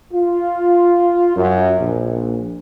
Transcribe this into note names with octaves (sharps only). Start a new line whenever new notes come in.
F4
F#2
A#1